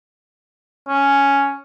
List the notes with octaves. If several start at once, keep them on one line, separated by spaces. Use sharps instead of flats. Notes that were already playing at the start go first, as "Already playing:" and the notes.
C#4